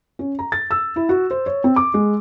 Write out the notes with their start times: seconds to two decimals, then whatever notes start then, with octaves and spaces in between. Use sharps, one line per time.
0.19 C#4
0.39 A#5
0.52 A6
0.71 E6
0.96 E4
1.09 F#4
1.31 C5
1.46 C#5
1.64 C4
1.76 D6
1.94 G#3